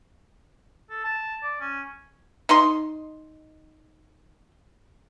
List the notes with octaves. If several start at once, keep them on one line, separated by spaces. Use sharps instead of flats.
A4
A5
D5
C#4
D#4 D#5 C6